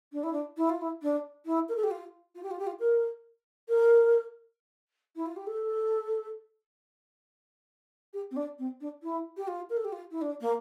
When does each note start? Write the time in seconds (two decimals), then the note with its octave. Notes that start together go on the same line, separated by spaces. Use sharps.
0.13 D4
0.23 E4
0.33 D4
0.57 E4
0.69 F4
0.81 E4
1.02 D4
1.46 E4
1.69 A#4
1.76 A4
1.84 G4
1.91 F4
2.35 F4
2.43 G4
2.51 F4
2.59 G4
2.67 F4
2.80 A#4
3.69 A#4
5.16 E4
5.26 F4
5.36 G4
5.47 A4
8.14 G4
8.31 C4
8.36 D4
8.59 C4
8.81 D4
9.03 E4
9.37 G4
9.48 F4
9.70 A#4
9.77 A4
9.84 G4
9.92 F4
10.11 E4
10.21 D4
10.41 A#3